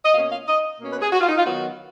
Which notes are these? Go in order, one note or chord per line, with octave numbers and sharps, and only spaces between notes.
D#5
B2 A#3 C#4 F5
F5
D#5
B2 A#3 C#4
B4
G#4
F#4
F4
D#4
F4
D#3 F#3 B3 F#4